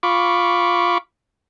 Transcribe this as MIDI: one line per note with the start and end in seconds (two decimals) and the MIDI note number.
0.03 0.98 65
0.03 0.98 83
0.03 0.98 85
0.03 0.98 86